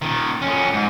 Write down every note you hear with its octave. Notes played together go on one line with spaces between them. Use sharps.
A#2 D#3
F2 C#4
G#2